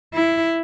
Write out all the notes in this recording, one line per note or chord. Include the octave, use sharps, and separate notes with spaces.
E4